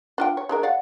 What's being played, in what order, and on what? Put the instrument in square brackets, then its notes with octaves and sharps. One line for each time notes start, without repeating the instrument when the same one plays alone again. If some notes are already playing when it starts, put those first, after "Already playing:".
[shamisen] D4 F4 G5
C#5
G#3 D4 A#4
D5 F5 F#5